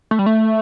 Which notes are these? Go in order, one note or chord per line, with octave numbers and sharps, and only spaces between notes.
A3
G3
A3